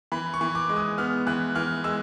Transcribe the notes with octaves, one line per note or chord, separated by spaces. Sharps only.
E3 B5
C#6
E3
D6
G#3
D#6
B3 F6
E3 F#6
E3 F6
G#3 E6